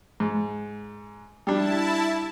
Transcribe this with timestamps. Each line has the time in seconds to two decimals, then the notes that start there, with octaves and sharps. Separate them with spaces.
0.20 G#2
1.47 G3 D4 E4 A5